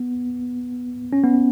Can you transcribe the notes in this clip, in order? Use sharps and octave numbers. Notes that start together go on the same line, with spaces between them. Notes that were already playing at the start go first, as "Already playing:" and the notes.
Already playing: B3
C#4
B3